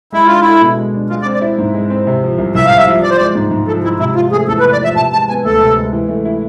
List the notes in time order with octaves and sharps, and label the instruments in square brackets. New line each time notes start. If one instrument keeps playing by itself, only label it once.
[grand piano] G#3 [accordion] E4
[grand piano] D4 [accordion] F4
[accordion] E4 [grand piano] A4
[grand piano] B2
G#3
D4
[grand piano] G#3 [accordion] F4
[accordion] D5
[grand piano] C4
[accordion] D5
[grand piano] E4
G#2
G#3
C4
C3
F3
C2
[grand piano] C2 [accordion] E5
[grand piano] C3 [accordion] F5
[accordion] E5
[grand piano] F3
[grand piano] F3 [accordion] D5
[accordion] C5
[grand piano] G#3 [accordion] D5
[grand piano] G#2
G#2
[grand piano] F3 [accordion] A4
[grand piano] G#3 [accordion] E4
[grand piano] C3 [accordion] E4
[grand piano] F3 [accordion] F4
[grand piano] A3 [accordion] G#4
[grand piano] E2 [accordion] A4
[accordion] B4
[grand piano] C3
[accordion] D5
[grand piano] F3 [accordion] E5
[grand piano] C3 [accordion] A5
[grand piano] G#3 [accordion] A5
[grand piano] B3 [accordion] G#5
[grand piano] D2 [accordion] A4
[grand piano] C3
G#3
E3
A3
E4